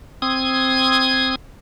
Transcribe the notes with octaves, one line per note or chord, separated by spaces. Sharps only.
C4 D#6 G#6